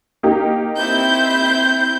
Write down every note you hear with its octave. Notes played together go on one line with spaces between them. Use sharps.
A#3 D#4 G4
C4 E4 G6